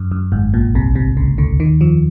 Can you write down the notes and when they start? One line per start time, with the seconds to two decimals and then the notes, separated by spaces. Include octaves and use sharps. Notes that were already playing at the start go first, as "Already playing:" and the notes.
Already playing: F#2
0.12 F#2
0.32 G#1 G#2
0.54 A#1 A#2
0.75 C2 C3
0.95 C2 C3
1.17 C#2 C#3
1.38 D2 D3
1.60 D#2 D#3
1.81 F2 F3